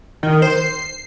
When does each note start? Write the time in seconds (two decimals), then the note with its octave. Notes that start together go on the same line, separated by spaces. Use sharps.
0.23 D#3
0.42 C5
0.56 C7